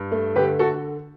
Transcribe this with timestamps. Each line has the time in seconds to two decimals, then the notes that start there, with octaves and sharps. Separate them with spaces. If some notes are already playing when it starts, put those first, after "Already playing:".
Already playing: G2
0.12 A3
0.36 D3 G4 B4
0.59 F#4 A4